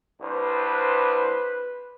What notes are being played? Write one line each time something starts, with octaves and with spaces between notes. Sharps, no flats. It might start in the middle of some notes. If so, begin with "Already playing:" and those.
C2 D4 B4 C5